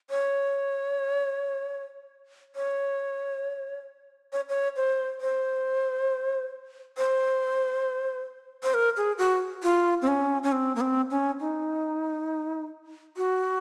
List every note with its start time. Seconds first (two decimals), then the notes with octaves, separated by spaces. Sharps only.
0.10 C#5
2.56 C#5
4.33 C#5
4.49 C#5
4.76 C5
5.21 C5
6.98 C5
8.63 C5
8.74 A#4
8.97 G#4
9.18 F#4
9.63 F4
10.02 C4
10.07 C#4
10.43 C#4
10.52 C4
10.76 A#3
10.81 C4
11.11 C#4
11.40 D#4
13.17 F#4